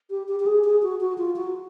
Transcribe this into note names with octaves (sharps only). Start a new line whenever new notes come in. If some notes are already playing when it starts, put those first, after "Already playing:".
G4
G4
G4
G#4
G#4
F#4
F#4
F4
F#4